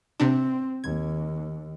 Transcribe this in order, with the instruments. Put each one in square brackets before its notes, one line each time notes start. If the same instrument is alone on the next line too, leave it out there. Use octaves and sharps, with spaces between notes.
[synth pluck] C3 D4 [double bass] C4
[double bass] D#2 [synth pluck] G#6